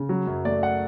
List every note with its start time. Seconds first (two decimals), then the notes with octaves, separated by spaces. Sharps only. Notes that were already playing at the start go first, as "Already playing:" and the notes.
Already playing: C#3
0.09 F#3
0.27 F#2
0.45 A3 D5
0.63 F#5